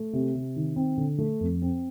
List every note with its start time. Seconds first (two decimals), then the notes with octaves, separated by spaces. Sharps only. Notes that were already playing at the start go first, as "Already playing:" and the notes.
Already playing: A3
0.13 C3
0.35 C3
0.56 D#3
0.76 C4
0.97 D3
1.18 A3
1.40 F2
1.62 C4